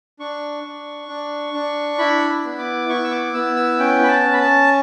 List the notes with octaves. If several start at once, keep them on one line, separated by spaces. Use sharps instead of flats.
D4 C#6
D4
D4
D4
E4 B5
B5
B3
D6
E4 C#6
E6
D6
B3 E6
E6
C#4 G5
B5
A5
C#4
B5
A5